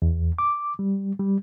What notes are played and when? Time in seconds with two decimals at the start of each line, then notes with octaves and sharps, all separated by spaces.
0.02 E2
0.39 D6
0.79 G3
1.19 G3